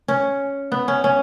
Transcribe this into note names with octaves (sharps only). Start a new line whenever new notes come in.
C#4
B3
C#4
C#4